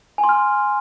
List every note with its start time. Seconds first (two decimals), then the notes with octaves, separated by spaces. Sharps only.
0.18 G#5
0.24 C6
0.29 F6